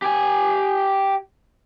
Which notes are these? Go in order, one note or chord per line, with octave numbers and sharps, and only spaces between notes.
G4 G#5